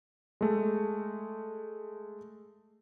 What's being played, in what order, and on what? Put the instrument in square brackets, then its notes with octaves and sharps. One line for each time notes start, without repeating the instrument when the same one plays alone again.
[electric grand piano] G#3 A3